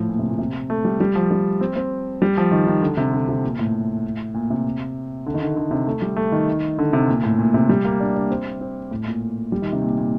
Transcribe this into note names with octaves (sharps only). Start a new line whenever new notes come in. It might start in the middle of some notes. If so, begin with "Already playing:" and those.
Already playing: A2 F3
A#2
C3
A#2
C3
A3
G3
G3
F3
G3
C4
C4
G3
F3
D#3
D#3
D3
C3
D3
C3
A#2
A2
A#2
C3
D3
D#3
D3
D3
C3
A3
G3
A3
D#3
D3
C3
A#2
A2
A#2
C3
G3
A#3
D4
D4
C4
C4
A2
A#2
G3
D#3
C3
A#2
A#2